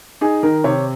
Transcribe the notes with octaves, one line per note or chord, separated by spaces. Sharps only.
D#4 G#4
D#3 A#4
C3 C#5